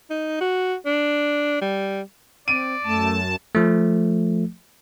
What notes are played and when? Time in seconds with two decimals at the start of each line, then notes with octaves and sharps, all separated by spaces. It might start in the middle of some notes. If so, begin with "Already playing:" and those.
0.10 D#4
0.41 F#4
0.86 D4
1.61 G3
2.48 C4 D5 D7 D#7
2.84 F#2 A3 A5
3.55 F3 A3